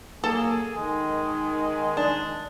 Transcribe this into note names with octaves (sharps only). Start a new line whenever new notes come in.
F#3 A#3 G#4 A4 A5
D#3 G#3
D4